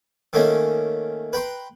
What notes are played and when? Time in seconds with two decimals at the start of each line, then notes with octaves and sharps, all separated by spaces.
0.33 D#3 A3 A#3 C#4 D#4
1.33 B4 G5 A#5 C6